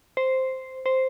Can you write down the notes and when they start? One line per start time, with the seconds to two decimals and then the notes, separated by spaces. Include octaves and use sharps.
0.17 C5
0.86 C5